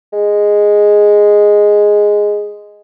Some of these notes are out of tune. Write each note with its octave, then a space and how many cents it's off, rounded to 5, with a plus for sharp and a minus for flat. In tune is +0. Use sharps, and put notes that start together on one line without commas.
G#3 -5